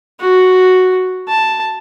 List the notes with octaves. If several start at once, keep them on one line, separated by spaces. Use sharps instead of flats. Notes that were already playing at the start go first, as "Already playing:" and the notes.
F#4
A5